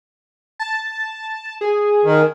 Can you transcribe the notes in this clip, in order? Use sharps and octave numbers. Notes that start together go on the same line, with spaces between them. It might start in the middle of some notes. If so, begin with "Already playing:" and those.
A5
G#4
D#3